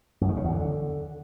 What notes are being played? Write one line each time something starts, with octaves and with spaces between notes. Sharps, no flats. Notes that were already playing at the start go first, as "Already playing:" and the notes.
F#2
D#3
C#3
E2
D3